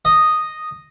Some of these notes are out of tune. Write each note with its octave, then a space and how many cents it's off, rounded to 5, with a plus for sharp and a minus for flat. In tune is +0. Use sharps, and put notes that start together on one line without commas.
D#5 -5